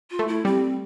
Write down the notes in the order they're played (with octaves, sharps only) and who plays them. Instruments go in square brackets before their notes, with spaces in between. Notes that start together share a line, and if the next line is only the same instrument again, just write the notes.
[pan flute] F4
[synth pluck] A3
[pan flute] E4
[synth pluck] G3 [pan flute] C4